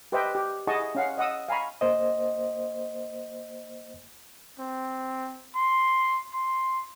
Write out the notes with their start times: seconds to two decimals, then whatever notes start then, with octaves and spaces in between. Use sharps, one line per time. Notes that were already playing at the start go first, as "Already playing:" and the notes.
0.12 G4 B4 C5 D#5 E5 G5
0.35 G4
0.67 E4 G#4 D#5 F#5 A5 C#6
0.95 C#4 F5 F#5
1.18 D#5 F#5 D#6 E6
1.49 F5 G#5 A#5 B5 C#6
1.81 A#3 C5 D#5
4.59 C4
5.55 C6
6.34 C6